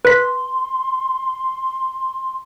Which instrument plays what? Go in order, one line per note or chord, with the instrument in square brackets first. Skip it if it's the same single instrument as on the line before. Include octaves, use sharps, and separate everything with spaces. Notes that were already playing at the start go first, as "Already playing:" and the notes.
[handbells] B4 B6 [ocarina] C6